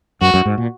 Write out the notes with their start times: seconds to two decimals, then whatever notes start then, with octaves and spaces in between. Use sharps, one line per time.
0.21 F#2 F#4
0.34 F#2
0.45 G#2
0.58 A#2